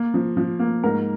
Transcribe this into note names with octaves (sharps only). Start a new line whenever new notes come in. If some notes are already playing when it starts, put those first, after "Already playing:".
Already playing: A#3
F3
F3
A#3
G#2 A#4